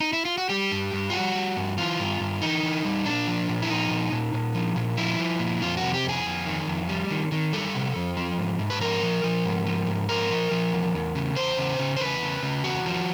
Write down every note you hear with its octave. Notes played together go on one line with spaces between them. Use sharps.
D#4
E4
F4
F#4
G3 G4
G2
G2
F4
G3 F#4
G3
G2
E3 F4
G2
G2
E3 D#4
E3
G3
A#2 D4
F3
A#2
E4
F3 D#4
A#2
A#2
A#2
F3
A#2
F3 E4
F3
A#2
F2 F4
F#4
C3
G4
F2 G#4
F2
D#3
F2
G3
D#3
D#3
G3 A4
C3
F2
F3
G#2
G#2
B4
F3 A#4
F3
F3
G#2
F3
G#2
F3 A#4
F3
F3
E2
E2
C#3
E2 C5
C#3
C#3
C5
E2 B4
C#3
C#3
E2 F#4
F3